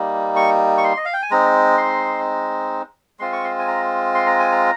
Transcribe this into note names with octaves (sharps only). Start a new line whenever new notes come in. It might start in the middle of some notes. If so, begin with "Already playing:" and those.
Already playing: G3 A#3 D#4
C#6
C#6
C6
D#5
F5
G5
G#5
G#3 C4 D#4 A#5
C6
G#3 C4 F4 C6
C#6
C6
G#5
A#5
C6
A#5
G#5
A#5